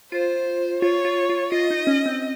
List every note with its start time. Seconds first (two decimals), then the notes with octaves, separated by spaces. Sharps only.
0.12 F4 C5
0.82 F4 C#5
1.05 F4
1.29 F4
1.52 F4 D#5
1.70 D#4
1.87 C#4
2.06 C4